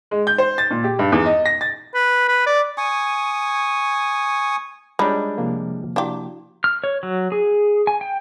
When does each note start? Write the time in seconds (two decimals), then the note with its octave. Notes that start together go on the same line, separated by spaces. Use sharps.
0.11 G#3
0.27 G6
0.38 C5
0.58 A6
0.71 A#2
0.84 G4
0.99 G2
1.12 E2
1.26 D#5
1.46 A#6
1.61 A6
1.95 B4
2.28 B4
2.47 D5
2.78 G#5 C#6 D#6
4.99 G3 G#3 D4 D#4 F4 C#5
5.38 C3 F3 A#3
5.96 D4 E4 F#4 G4 F5
6.64 F6
6.84 C#5
7.03 F#3
7.32 G#4
7.87 G#5
8.01 G5